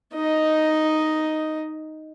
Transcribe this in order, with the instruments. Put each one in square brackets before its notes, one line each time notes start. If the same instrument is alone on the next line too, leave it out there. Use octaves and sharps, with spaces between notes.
[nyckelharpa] D#4 D#5